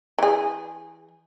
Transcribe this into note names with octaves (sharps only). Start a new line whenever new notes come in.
E3 G#4